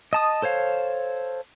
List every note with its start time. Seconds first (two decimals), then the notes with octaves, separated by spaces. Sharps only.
0.13 D#5 A5 D#6
0.42 A4 C5 C#5 F5